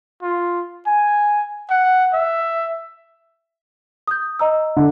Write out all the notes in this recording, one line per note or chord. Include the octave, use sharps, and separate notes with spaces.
F4
G#5
F#5
E5
D#6 G6
D#5 A#5 E6
D3